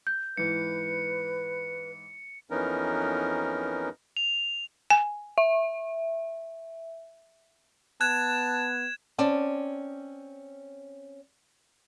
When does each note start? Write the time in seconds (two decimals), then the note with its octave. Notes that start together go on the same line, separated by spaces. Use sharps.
0.07 G6
0.37 G#2 E3 B4 C#7
2.50 F2 E3 B3 C#4 D#4 A#4
4.17 F7
4.90 G#5
5.38 E5
8.01 B3 A5 F#6 G#6 E7
9.18 C4 C#4 D5 A5